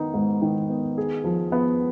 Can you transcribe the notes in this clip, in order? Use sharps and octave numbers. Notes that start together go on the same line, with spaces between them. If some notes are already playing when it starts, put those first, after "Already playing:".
Already playing: D#3 B3 D#4
G#2
D#3
B3
G#4
F3
B3